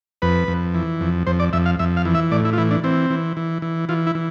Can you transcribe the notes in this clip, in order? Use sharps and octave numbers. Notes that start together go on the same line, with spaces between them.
F2 B4
F2
E3
F2
F2 C5
D5
F2 E5
F5
F2 E5
F5
E3
E5
A2 D5
E4
F4
E3 E4
D4
E3 C4
E3
E3
E3
E3 F4
E4
E3